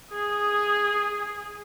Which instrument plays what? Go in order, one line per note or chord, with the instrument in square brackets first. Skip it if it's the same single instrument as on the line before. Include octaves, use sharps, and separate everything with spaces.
[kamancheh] G#4 D#6